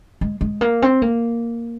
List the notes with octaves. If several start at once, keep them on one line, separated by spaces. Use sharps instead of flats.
G#3
G#3
A#3
C4
A#3